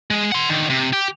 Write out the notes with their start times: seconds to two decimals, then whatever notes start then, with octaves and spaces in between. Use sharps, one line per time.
0.11 G#3
0.32 F#5 C6
0.50 D3 D#3
0.70 C3
0.93 G4